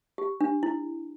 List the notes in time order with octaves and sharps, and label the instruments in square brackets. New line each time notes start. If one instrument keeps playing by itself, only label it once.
[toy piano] G4
D4
E4